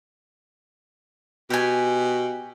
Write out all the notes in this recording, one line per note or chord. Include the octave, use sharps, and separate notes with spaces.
B2 G4 G#5